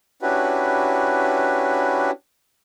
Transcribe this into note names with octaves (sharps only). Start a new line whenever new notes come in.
C#4 D4 E4 F#4 G4 B4